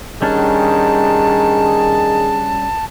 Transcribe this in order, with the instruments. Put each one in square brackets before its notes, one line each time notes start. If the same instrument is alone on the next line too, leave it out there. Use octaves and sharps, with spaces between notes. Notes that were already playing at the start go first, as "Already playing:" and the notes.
[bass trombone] D#3 [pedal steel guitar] G3 C#4 D4 [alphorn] G#4 [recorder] A5